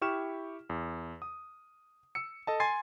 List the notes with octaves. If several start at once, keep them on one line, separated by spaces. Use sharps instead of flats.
E4 G4 C#6 F6 E7
E2
D#6
E6 C#7
A4 D#5 A5
G#5 C6 G#6 A6 C7